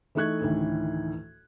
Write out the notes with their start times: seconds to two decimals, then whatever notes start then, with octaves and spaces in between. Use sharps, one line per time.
0.15 E3 A3 D#4 C#6 F#6 G#6
0.41 D2 A2 D#3 E3